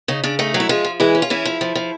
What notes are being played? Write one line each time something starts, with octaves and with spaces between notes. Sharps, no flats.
C#3 D#4
C#3 D4
A3 D#4
F#3
E4
F3 G#3 F4
F3
E3 G#3 E4
C#4
F4
E3 C#4 E4
F3
F3
F3